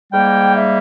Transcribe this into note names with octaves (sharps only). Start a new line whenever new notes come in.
G#2 G3 A#3 G5
E5